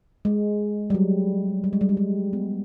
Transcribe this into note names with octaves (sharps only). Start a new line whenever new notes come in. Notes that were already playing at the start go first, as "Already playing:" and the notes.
G#3
G3
F#3
G3
G#3
G3
G#3
G3
B3